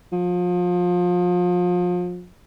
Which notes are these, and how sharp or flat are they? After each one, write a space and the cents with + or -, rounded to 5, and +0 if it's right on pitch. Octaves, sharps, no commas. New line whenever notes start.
F3 +30